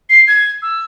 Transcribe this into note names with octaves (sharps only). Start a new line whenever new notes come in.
C7
G#6
E6